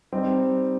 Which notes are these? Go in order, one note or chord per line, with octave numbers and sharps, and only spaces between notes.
G3 C4 D#4